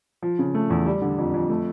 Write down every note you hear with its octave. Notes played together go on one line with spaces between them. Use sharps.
F3
C#3
A3
E2
G3
D3
F2
F2
A3